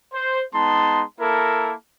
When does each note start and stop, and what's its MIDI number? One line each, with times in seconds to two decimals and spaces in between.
0.13 0.42 72
0.54 1.03 56
0.54 1.03 59
0.54 1.03 63
0.54 1.03 81
0.54 1.03 84
1.21 1.74 58
1.21 1.74 64
1.21 1.74 69
1.21 1.74 70